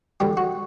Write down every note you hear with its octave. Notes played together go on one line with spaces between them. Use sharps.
F2 D3 G3 G4
F#4